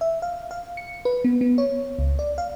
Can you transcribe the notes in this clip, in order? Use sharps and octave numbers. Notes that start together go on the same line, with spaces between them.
E5
F5
F5
C#7
B4
B3
B3
C#5
C#2
D5
F5